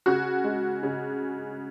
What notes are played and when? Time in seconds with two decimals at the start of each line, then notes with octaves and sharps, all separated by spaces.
0.06 C#3 F#4
0.44 G#3
0.83 C#3